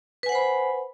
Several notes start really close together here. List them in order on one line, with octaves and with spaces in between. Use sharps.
B4 G#5 F#5 C5 B5